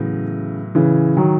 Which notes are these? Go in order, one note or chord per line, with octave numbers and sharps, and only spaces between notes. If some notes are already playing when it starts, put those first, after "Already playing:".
Already playing: A2 C#3 E3 F#3 B3
C#3 E3
D#3 F#3